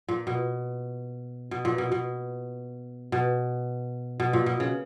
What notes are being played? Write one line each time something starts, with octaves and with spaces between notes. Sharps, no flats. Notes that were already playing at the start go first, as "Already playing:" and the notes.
A#2
B2
B2
A#2
B2
B2
B2
B2
A#2
B2
C#3